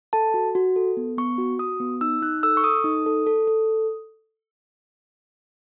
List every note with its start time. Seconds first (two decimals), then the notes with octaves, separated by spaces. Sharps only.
0.13 A4 A5
0.34 F#4
0.55 F#4
0.76 A4
0.97 B3
1.18 B3 C#6
1.38 F#4
1.59 F#4 D#6
1.80 B3
2.01 D#4 E6
2.22 D#4 F#6
2.43 A4 E6
2.57 C#6
2.64 A4 D#6
2.84 D#4
3.06 A4
3.26 A4
3.47 A4